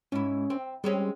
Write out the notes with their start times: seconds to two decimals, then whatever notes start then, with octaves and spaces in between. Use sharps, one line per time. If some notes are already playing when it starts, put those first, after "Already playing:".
0.12 G#2 C#4 E4
0.50 C4
0.84 G3 G#3 C4 C#4